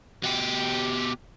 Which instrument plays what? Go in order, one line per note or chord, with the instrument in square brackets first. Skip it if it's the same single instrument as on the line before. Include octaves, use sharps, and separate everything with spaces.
[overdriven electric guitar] B2 G4